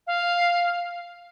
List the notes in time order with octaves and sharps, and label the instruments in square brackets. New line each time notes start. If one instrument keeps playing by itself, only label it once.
[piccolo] F5